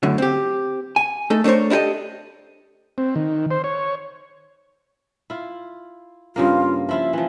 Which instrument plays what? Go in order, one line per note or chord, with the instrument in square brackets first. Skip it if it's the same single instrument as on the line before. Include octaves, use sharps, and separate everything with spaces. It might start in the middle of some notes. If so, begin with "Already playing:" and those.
[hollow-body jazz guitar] F#2 A2 D3 F#3
C4 G4
G#5
A3 D#4 A4
A3 D4 A#4 C5 C#5
D4 E4 G4 A4 D#5
[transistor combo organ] C4
D#3
C5
C#5
[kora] E4 F4
[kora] G2 C#3 A#3 [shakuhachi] F4
[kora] F3 E4 F4 [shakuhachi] E5
[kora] E3 F3